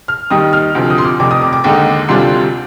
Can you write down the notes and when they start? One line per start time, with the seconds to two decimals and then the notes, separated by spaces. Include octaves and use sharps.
0.08 F6
0.30 D#2 D#3 G3 D#6
0.53 F6
0.75 D2 C3 F3
0.90 D#6
0.98 C6
1.04 D6
1.19 F1 F2 C3 D6
1.31 D#6
1.42 D6
1.53 D6
1.64 D#2 D3 G#3 D#4 D6
2.08 D2 C3 G3 D4 F4 C6